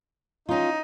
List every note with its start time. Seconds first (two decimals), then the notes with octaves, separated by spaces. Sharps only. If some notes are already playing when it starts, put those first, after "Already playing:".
0.49 C#4 D#4 F4